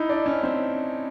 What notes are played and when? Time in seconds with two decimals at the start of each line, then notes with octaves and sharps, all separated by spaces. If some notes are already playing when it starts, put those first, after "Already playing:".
Already playing: D#4 E4
0.09 D4
0.26 C#4
0.43 C4